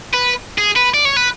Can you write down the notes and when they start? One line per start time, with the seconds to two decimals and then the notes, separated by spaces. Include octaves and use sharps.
0.14 B4
0.58 G#4
0.76 B4
0.94 D5
1.05 C#5
1.17 B4